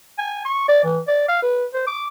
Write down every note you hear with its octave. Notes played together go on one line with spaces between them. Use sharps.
G#5
C#6
D5
E3
D5
F5
B4
C5
D6